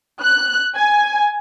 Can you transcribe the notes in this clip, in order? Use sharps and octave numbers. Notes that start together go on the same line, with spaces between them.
F#6
G#5